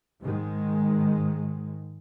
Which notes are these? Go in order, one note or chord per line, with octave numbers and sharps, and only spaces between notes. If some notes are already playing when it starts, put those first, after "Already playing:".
G#2 D#3 G#3